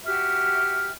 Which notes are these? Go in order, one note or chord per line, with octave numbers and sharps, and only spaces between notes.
F#4 G4 E5 F6